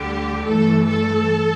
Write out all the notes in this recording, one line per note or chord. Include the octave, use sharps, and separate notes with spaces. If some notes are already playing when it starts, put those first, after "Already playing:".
Already playing: D2 D3 G3 G4
G2 E3 A3 A4
A4